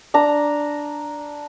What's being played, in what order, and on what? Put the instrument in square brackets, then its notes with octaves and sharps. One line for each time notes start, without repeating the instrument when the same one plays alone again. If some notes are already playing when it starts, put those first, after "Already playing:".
[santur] D4 A#5